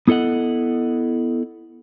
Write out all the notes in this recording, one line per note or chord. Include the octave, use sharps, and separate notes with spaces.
B3 E4 A4 D#5 F#5